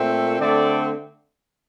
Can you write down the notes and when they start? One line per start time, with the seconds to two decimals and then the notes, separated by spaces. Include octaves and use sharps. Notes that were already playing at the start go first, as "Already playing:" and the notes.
Already playing: A#2 A3 C4
0.39 D3 A3 C4 D5